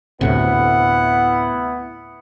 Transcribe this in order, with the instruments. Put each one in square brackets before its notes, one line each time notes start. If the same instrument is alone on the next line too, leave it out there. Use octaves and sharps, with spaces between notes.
[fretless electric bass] D2 A2 C3 [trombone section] B3 E4 [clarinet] F#5